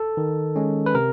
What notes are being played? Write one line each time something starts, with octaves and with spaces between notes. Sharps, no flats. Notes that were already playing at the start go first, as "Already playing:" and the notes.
Already playing: A4
D#3
G#3 C#4
B4
C3 A#4